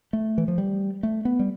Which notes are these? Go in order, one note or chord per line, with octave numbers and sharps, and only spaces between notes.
A3
E3
F3
G3
A3
B3
G3